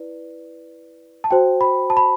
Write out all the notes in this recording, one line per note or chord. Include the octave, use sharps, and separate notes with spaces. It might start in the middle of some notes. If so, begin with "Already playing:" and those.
Already playing: E4 B4 D5
A5
F#4 C5 G5
B5
A5
B5